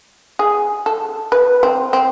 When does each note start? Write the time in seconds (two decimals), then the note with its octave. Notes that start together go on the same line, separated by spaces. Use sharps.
0.39 G#4
0.86 A4
1.32 B4
1.63 C4
1.93 C4